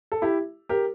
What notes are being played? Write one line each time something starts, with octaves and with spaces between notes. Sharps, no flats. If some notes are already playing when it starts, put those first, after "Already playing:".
A4
E4 G4
G4 A#4